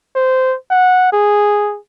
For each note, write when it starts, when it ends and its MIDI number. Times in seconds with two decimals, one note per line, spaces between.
0.16 0.56 72
0.71 1.09 78
1.13 1.78 68